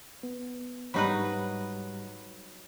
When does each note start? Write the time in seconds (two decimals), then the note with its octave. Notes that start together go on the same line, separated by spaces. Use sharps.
0.23 B3
0.94 G#2 F#3 G3 D#4 B4 B5